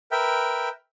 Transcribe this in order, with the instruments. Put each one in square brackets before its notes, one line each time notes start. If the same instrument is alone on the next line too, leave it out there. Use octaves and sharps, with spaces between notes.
[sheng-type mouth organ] A#4 B4 E5 G5